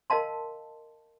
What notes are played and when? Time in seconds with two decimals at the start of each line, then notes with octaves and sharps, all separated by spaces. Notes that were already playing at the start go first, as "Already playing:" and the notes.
0.10 A#4 D#5 F5 A5 C6